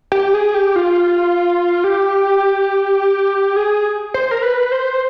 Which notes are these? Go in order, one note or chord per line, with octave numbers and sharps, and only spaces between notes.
G4
G#4
G4
F4
G4
G#4
C5
A#4
B4
C5